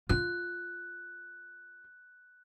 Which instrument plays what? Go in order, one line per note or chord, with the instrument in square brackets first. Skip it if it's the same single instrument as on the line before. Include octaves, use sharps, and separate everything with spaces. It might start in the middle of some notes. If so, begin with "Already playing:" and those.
[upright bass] F4 [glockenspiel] F#6